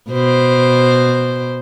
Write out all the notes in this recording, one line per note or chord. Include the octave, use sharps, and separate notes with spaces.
B2 C5